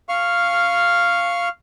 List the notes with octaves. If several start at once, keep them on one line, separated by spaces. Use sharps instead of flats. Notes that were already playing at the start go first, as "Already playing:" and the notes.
F5 C#6 F6